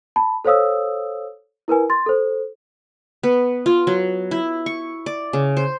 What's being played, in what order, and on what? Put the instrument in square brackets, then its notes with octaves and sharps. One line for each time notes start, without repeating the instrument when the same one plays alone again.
[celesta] A5 B5
A4 C5 C#5 F5 D#6 E6
E4 A#4 B4 G#5
C6 A6
A4 C5
[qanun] B3
F4
F#3
E4
C#6
D5
C#3
C5